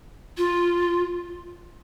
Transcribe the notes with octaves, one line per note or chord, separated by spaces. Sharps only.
F4